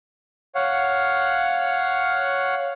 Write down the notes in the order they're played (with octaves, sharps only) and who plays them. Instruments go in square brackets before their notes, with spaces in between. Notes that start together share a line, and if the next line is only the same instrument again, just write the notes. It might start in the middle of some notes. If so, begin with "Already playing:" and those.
[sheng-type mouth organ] C#5 F5 F#5